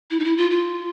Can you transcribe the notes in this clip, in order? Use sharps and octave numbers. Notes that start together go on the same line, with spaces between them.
E4
D#4
E4
F4
F4